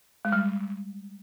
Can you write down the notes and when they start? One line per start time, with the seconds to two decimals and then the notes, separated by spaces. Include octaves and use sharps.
0.25 G#3
0.32 G3